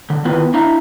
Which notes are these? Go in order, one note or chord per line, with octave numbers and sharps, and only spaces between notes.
D3
D#3 B3 C4 E4 F4 B4
D4 E4 E5 F5 A#5